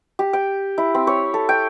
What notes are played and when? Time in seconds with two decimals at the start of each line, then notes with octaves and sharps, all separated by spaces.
0.19 G4
0.33 G5
0.78 E4
0.94 C4
1.07 C#5
1.34 A4
1.49 G5